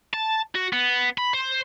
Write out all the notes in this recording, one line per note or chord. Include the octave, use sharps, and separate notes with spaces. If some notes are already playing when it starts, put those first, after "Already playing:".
A5
F#4
B3
B5
C5